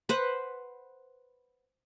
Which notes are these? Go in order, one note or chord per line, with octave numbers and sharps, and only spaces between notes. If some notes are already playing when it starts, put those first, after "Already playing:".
B4 C5 F#5